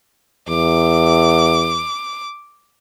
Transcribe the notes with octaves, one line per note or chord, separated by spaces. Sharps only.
E2 D6